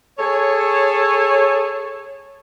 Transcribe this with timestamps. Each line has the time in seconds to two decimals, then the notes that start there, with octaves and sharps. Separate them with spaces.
0.19 G#4 A4 C#5